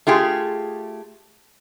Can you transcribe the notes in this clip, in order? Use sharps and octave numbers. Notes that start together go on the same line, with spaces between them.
A3 F4 G4 G#4